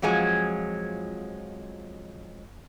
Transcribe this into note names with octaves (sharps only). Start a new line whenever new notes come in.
F2 F3 F#3 G#3 G#5